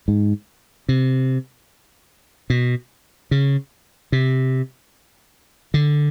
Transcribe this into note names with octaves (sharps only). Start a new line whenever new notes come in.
G#2
C3
B2
C#3
C3
D3